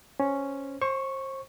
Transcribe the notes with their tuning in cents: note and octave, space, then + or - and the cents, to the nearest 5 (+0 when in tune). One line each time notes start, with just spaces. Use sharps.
C#4 +0 C5 +0
C5 +30 C#6 +0